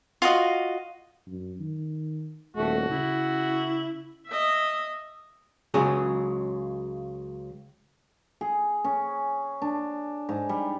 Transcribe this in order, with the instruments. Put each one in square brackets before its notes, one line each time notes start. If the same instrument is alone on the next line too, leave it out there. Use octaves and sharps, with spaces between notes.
[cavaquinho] F4 F#4 D#5
[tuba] F#2
D#3
[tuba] D#1 [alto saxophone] A3 [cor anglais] F#4
[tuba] C#3 [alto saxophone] E4
[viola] D#5 E5
[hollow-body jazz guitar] C#2 C#3 F#3 G#3 G#4
[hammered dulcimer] G#4
C#4
D4
G#2
G3